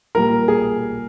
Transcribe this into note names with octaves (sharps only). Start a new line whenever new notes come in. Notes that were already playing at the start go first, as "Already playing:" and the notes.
A#2 G3 A#3 A#4
G#4